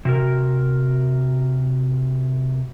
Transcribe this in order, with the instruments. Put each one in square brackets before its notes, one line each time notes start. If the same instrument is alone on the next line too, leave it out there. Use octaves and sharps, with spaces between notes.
[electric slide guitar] C3 F#4 A#4